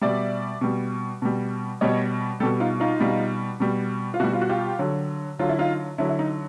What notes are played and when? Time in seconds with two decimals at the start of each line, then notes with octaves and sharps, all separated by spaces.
0.01 B2 G3 D5 E5
0.61 B2 G3
1.22 B2 G3
1.81 B2 G3 C#5 D#5
2.40 G3 G4 A4
2.43 B2
2.60 D#4 F4
2.80 D#4 F4
3.00 B2 G3
3.60 B2 G3
4.14 F4
4.20 B2 G3 E4 F#4
4.33 F4
4.42 F#4
4.49 F4 G4
4.79 D3 F#3
5.39 D3 F#3 F4
5.49 E4
5.59 D#4 F4
5.98 D3 F#3 E4
6.09 E4
6.19 D#4